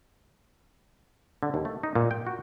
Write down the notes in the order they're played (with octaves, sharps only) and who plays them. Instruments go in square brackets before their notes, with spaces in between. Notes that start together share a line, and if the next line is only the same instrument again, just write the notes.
[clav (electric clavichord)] D3
D#2
A3
D#4
A#2
G5
F#4